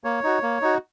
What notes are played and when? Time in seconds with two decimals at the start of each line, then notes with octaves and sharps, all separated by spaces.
0.04 A#3 C#5
0.24 D#4 F#4
0.43 A#3
0.62 D#4 F#4